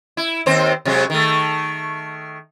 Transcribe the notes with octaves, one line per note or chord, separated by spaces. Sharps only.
E4
D#2 C4 C5
C3 F#3 G#3
D#3 A3